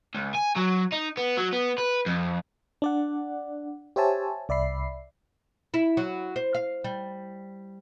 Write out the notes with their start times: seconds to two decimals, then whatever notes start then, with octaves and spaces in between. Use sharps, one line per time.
0.15 C#2
0.35 G#5
0.56 F#3
0.92 D#4
1.17 B3
1.37 F#3
1.52 B3
1.78 B4
2.06 F2
2.82 D4 D5 F#5
3.96 G4 C5 C#5 E5 G#5 A5
4.49 C2 D5 E5 B5 C7
5.74 E4
5.97 F#3
6.36 C5
6.55 F5
6.84 G3